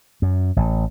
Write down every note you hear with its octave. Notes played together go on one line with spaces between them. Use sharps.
F#2
A1